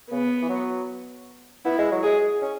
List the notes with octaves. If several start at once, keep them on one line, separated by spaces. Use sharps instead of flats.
C#3 B3
E3
F#3
B3 E4
G#3
F#3
G#3 G#4
C#4